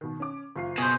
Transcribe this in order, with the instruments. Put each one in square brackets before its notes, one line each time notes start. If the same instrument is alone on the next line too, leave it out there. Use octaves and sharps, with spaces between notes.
[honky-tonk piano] B2 D#3
C#4 D6
F#1 F4 C7
[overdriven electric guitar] B2 [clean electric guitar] G#4 C5